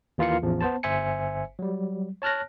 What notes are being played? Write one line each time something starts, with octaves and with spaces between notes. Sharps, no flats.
D#2 E3 F4 A#4 F5 C#7
A1 E2 F3
B3 C5 A5
G1 C5 E5 G#5 C#7
F#3 G3
C#5 A5 F6 F#6 A#6